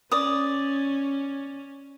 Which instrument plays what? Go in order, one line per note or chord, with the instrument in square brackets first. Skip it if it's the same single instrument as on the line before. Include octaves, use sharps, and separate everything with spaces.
[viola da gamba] C#4 [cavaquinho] D5 D#6